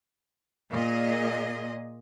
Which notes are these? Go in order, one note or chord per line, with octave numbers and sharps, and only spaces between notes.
A#2 G#4 D#5